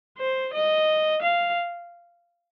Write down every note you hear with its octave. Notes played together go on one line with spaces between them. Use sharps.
C5
D#5
F5